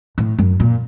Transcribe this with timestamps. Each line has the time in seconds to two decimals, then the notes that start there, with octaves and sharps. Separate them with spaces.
0.18 A2
0.39 F#2
0.60 A#2